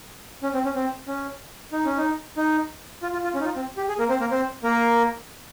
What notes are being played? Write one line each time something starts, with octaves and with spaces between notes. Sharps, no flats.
C#4
C4
C#4
C4
C#4
D#4
C#4
D#4
D#4
F4
F4
F4
C#4
D#4
F4
C4
G4
G#4
A#3 A#4
C4 C5
A#3 A#4
C4 C5
A#3 A#4